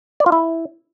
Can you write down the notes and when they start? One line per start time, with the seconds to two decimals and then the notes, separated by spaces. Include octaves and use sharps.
0.20 D5
0.26 F4
0.32 E4